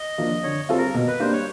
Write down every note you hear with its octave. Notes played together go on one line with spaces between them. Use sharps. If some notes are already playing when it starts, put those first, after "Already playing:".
Already playing: D#5
F3 A#3 D4
D3 C#5
G3 C4 F4 A4
A#4
B2
B4
G3 A#3 D4 C5
C#5